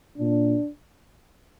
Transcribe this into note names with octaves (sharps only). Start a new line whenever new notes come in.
A#2 D4